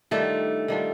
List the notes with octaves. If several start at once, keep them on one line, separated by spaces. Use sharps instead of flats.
D#3 G3 A3 D4 F4
D#3 G3 D4 F4